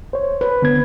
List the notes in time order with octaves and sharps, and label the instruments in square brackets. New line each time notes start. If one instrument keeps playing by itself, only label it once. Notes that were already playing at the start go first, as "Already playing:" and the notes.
[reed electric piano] C5 C#5
[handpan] B4
[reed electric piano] D3 B3 G#6